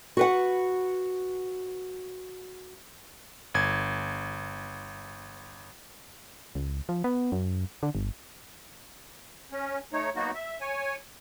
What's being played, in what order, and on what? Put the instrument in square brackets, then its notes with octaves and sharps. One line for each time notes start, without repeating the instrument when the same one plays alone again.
[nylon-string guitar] F#4 B4 F#5
[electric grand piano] G1 G#6
[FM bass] C#2
F3
B3
F#2
D3
G1
[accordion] C#4
A3 D#4 C#5
F#3 A#3 B3 D#4 F#4
E5
C#5 G#5